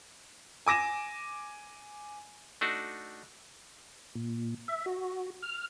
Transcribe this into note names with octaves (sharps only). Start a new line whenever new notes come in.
G#5 D6 A#6 E7
A3 D4 D#4 F#4
A#2
E5
F#4
F6